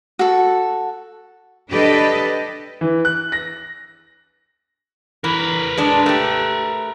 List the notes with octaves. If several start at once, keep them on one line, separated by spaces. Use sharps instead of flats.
F#4 A4
D4 G4 A4 B4 D#5
E3
F#6
A#6
E3 A#4 B4
G#3 D4
A3 G4